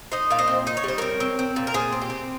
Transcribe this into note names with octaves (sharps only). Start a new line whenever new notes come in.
D#4 C5 D#5
A#2 F5
C5 D#5
C4
D#4 D#5
C#5
G3 C5
C4 A#4 C#5
C4
C4
A#2
A#4
A#2 G#4 C5
C4
G4
C4